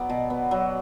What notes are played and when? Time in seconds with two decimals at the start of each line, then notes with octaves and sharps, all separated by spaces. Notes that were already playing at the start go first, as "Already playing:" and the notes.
Already playing: F#3 B3 D5
0.10 B2
0.30 B3
0.51 F#3